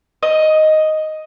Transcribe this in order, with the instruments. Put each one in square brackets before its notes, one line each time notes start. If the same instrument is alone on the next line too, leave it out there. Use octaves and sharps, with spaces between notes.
[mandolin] D#5